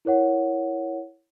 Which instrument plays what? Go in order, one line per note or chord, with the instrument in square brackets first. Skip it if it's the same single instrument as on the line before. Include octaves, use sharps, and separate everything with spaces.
[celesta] E4 A#4 C#5 F#5